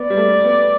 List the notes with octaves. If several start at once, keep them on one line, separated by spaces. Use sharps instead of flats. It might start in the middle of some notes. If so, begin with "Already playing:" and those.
Already playing: B3 D5
G3
A3
B3